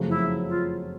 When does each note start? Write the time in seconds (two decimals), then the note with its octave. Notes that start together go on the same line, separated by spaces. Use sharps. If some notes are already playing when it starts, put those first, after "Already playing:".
Already playing: F#1 F2 C#3 F#3 A3
0.10 E4
0.49 F4